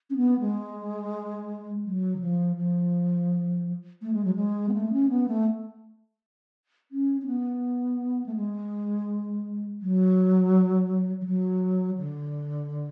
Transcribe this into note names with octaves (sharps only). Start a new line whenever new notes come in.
C#4
B3
G#3
F#3
D3
F3
F3
A3
G#3
F#3
G#3
B3
A3
C#4
B3
A3
C#4
C#4
B3
A3
G#3
F#3
F3
F#3
D3